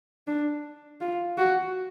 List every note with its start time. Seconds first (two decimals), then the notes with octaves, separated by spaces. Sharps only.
0.27 D4
1.01 F4
1.38 F#4